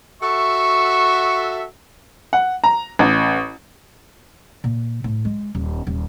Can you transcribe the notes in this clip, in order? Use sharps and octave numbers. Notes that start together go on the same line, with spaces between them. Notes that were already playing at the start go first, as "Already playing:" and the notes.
F#4 A4 E5 C#6
F#5
A#5
A1
A#2
A2
G#3
D#1
D#1